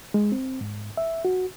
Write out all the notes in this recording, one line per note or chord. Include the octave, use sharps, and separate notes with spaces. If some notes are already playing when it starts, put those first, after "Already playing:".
G#3
C4
G#2
E5
F#4